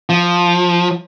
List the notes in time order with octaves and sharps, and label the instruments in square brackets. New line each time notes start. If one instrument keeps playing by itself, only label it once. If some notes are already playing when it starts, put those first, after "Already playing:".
[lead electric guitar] F3